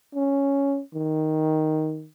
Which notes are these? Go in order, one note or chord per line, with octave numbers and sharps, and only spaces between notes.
C#4
D#3